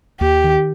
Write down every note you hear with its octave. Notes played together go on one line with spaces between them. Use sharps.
D#2 G4
D#3